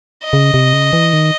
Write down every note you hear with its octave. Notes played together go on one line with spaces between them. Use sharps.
D#5
C#3
C3
C#3
E3
D#3